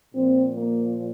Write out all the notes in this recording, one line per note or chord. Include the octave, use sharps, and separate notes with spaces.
A#2 F3 C4
A#3